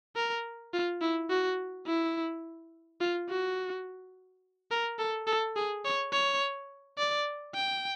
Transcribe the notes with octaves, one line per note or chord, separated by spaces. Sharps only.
A#4
F4
E4
F#4
E4
F4
F#4
A#4
A4
A4
G#4
C#5
C#5
D5
G5